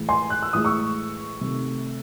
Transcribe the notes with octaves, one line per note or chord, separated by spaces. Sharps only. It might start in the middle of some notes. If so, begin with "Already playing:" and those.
Already playing: A2 E3 G#3
G#5 C6
F#6
E6
A2 E3 G#3 D#6
C#6 E6
C3 D#3 A3